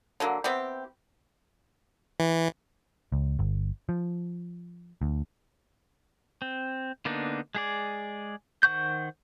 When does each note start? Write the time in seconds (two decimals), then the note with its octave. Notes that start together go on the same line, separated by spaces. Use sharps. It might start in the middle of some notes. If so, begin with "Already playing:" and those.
0.20 D3 F#3 A#3
0.44 B3 C4 E4 G4
2.20 E3
3.12 C#2
3.39 G1
3.89 F3
5.01 D2
6.42 C4
7.05 D3 A#3 B3 D4 D#4
7.55 G#3 G#4 D5
8.63 D#3 C5 F#5 C#6 G6